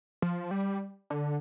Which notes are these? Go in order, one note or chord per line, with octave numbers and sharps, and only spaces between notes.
F3
G3
D3